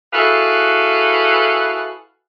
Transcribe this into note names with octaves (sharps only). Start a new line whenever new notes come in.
E4 F#4 G#4 A4 B4 F5